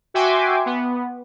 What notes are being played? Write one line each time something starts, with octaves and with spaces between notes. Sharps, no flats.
F#4 E5 G5 G#5 C6 D6
B3